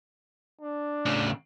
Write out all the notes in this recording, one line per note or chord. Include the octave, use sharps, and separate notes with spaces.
D4
A2 C#3